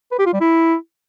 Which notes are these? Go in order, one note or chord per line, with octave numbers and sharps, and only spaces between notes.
B4
G4
F4
G3
E4